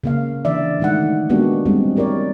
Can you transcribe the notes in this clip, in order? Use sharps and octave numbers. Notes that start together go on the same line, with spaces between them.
C#3 A#3 F5
D3 E3 D5 E5
D#3 F#3 G#3 A3 D#4 F#5
G#3 A#3 B3 D4 F#4 G4
G3 G#3 C4
E4 G4 A#4 C#5 D5